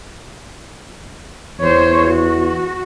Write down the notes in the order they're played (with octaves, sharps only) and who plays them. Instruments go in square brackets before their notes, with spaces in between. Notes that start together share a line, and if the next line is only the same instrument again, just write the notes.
[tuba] E2 [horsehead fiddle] C5 C#5
[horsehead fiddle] F#4